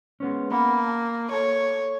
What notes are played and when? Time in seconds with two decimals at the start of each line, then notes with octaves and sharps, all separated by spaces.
0.20 G#3 B3 C#4
0.51 A#3 B3 F#5 B5
0.88 A5
1.31 A4 C#5 A5